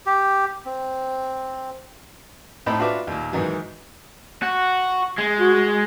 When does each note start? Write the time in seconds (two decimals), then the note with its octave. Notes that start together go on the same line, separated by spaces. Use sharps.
0.06 G4
0.65 C4
2.66 A2 C4 D#4 D#5 A5 B5
2.79 D4 F4 F#4 B4 E5 D6
3.07 D#2 A#2
3.32 G#2 D#3 E3 F#3
4.43 F#4
5.18 G#3
5.40 F#4